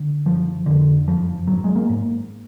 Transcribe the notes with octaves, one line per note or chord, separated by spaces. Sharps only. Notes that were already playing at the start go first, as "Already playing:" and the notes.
Already playing: D3
F#1 F3
F2 D3
F#1 F3
G#1 F#3
G#3
A#3
G#2